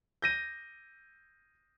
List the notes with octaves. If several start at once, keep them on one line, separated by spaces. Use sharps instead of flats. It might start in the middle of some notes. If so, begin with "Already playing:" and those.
G6 A#6 D#7